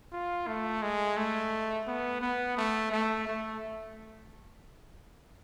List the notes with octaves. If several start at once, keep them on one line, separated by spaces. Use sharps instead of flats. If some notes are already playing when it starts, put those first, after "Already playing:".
F4
A3
G#3
A3
B3
B3
A3
A3
A3